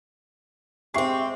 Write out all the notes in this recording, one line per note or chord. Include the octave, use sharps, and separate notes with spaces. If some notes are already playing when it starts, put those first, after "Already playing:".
G#3 C4 G4 E5 C#6 C7